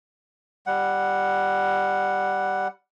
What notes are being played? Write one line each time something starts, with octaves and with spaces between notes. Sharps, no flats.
G3 F#5